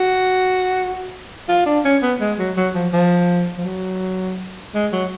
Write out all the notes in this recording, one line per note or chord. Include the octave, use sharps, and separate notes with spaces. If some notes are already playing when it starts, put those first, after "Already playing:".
Already playing: F#4
F4
D4
C#4
B3
G#3
F#3
F#3
F3
F3
F3
F#3
G#3
F#3